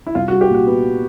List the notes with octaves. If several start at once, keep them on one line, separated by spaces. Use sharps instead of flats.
E4
C2 F4
F#4
G3
G4
A#2
F#4
B3